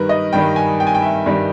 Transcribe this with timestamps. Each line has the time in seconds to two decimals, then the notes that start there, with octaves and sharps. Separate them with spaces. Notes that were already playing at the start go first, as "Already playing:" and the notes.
Already playing: G2 D#3 G3 A#4 B4
0.09 D#5
0.33 G2 D#3 G3 G5
0.56 G#5
0.80 G5
0.87 G#5
0.95 G5
1.02 E5
1.26 G2 D#3 G3